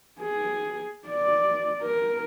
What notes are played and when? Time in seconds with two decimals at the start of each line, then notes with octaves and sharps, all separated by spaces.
0.21 G#4
1.09 D5
1.82 A#4